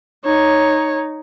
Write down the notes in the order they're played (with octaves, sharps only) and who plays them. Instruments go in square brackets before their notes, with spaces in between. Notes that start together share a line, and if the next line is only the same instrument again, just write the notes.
[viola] D#4 [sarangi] C#5